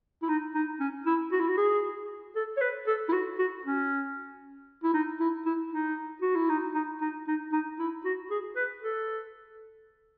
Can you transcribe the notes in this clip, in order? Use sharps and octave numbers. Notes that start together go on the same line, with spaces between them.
E4
D#4
D#4
C#4
E4
F#4
E4
F#4
G#4
A4
C#5
B4
A4
E4
F#4
F#4
C#4
E4
D#4
E4
E4
D#4
F#4
E4
D#4
D#4
D#4
D#4
D#4
E4
F#4
G#4
B4
A4